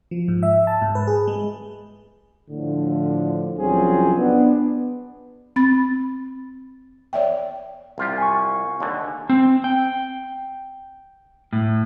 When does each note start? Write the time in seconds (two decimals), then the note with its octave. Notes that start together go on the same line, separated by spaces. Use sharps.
0.11 F3
0.28 G#2
0.43 E5
0.67 A5
0.82 G#2
0.95 B4
1.07 G#4
1.28 G#3
2.50 A2 D3 F3
3.58 C2 F3 F#3 C4 C#4 G#4
4.18 B3 D4
5.56 C4 B5 A6
7.13 C#5 D5 E5 G5
7.98 C2 F4 G4
8.18 G#5 C#6
8.80 D#2 D3
9.29 C4
9.64 G5
11.53 A2